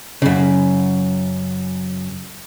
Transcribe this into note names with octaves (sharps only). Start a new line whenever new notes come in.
F#2 C#3